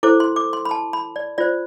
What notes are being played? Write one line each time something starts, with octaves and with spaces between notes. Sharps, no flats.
E4 A4 C5 D6
C6
D6
C6
B5
A5
B5
D5
F4 C5 D5